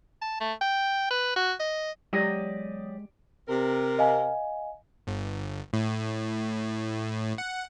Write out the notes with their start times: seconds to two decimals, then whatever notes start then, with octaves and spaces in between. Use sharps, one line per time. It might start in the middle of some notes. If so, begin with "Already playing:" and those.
0.22 A5
0.41 A3
0.61 G5
1.10 B4
1.36 F#4
1.60 D#5
2.13 E2 C#3 F#3 G#3 G4 D5 D#5
3.48 C3 A#4
3.99 D#5 F5 G#5
5.07 G1
5.73 A2
7.38 F#5